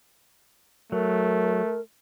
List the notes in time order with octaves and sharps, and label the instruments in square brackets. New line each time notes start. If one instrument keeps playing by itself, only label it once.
[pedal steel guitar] F#3 [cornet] A3 [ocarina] A#4